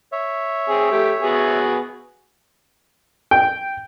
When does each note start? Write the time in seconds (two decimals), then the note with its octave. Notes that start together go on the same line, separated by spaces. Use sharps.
0.12 C#5 E5
0.69 C4 G#4
0.92 A3 G4
1.22 B3 F#4 G#4
3.31 G5